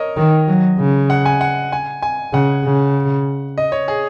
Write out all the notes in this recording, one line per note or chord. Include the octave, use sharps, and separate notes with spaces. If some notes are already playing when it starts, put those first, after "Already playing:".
Already playing: A#4 C#5 D#5
D#3
F#3
C#3
F#5
G#5
F#5
G#5
G#5
C#3 F#5
C#3
D#5
C#5
G#4